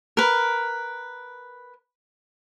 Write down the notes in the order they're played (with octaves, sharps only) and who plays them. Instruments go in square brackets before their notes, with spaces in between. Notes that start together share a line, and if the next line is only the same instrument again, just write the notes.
[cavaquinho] A#4 B4